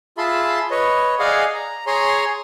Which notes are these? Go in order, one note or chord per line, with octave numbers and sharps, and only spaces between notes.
F4 G#4 E5 A5 B5 C6
B4 C#5 D#5
G#4 D5 D#5 F5 F#5 G#5
A#5
G#4 C#5 G#5 A#5 C6